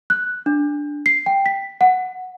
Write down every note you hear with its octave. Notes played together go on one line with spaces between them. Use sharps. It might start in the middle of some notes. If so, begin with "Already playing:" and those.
F#6
D4
C7
G5
B6
F#5